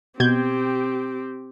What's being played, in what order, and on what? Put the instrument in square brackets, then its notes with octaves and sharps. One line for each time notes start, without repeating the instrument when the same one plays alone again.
[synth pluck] B2 G6 G#6 [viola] C4 G4